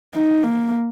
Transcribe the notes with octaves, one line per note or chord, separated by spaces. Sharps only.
D#4
A#3